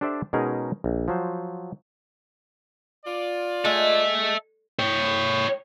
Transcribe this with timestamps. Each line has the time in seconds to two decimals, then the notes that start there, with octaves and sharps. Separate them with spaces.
0.01 D4 G4 A4 C5 D5 E5
0.33 B2 G#3 C#4 D#4 G#4 A#4
0.84 A#1
1.08 F3 F#3 C5
3.06 F4 D5
3.65 G#3 A4 E5
4.79 C#5 G5